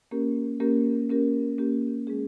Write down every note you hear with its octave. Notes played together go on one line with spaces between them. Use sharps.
A#3 C#4 G4 A#4
A#3 C#4 G4 A#4
A#3 C#4 G4 A#4
A#3 C#4 G4 A#4
G#3 C#4 G#4